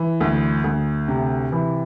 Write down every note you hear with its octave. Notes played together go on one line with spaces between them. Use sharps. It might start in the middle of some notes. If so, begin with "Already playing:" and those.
Already playing: E3
D2
D2
C3
E3